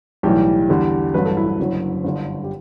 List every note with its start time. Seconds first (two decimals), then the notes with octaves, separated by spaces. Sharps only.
0.23 B1 A2 E3 G3 G4
0.69 E2 D3 G3
1.14 A1 G2 F#3 B4
1.25 A4
1.37 E4
1.47 E4
1.59 F#1 F#2 D3 F#3
2.04 G1 G2 D3
2.44 G4